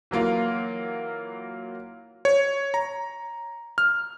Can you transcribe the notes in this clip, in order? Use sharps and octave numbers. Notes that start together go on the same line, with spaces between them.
E3 F#3 A#3 F4
C#5
A#5
F6